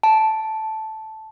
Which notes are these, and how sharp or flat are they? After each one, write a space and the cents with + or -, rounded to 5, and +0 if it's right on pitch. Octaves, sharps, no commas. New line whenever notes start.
A5 -5